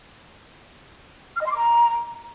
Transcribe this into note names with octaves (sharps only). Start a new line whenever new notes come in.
F6
D#5
C6
D6
A#5